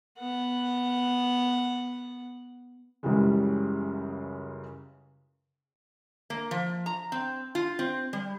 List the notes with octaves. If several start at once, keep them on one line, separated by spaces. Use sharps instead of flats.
B3 F#5
C#2 F#2 C#3 E3 G3 G#3
A#3
F3
A#5
C4
F4
C4
G3